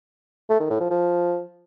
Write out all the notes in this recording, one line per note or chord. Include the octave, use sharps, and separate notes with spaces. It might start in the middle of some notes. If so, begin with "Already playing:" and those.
A3
D#3
A2
F3
F3